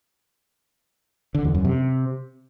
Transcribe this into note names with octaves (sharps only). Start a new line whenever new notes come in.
D3
E2
F#2
C3